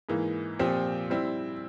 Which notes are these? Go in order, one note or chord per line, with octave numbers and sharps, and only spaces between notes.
G#2 E3 A#3
A#2 F3 C4 G4
G3 C4 E4